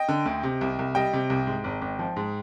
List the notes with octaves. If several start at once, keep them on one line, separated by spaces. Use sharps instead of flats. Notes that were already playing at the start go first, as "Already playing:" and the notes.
Already playing: D#5 G5
D3
D2
C3
C2
C2
G3 D#5 G5
C3
C2
G#2
G#1
G#1
F3
G#2